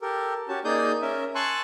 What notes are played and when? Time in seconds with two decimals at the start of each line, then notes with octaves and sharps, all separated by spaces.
0.02 G4 A4 A#4
0.49 C#4 F#4 G4 A5
0.64 A#3 D#4 G#4 D5 D#6 G6
1.02 C#4 A#4 E5
1.35 G#5 A5 C6 C#6 E6 F#6